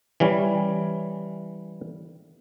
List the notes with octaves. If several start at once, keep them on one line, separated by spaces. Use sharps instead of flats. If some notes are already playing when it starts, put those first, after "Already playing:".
E3 G3 C#4